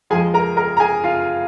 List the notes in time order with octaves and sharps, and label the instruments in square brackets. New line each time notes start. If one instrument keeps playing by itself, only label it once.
[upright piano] F2 F3 G#3 G#4 G#5
A#4 A#5
A#4 A#5
A#5
G#4 G#5
F4 F5